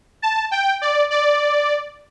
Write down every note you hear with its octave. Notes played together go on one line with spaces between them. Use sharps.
A5
G5
D5
D5